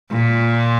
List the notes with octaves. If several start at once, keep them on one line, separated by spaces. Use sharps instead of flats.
A#2